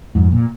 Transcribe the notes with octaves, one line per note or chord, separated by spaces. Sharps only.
F2 G#2
A#2